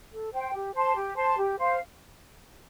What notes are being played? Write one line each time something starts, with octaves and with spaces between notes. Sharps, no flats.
A4
C5 G5
G4
C5 A5 C6
G4
C5 A5 C6
G4
C5 F5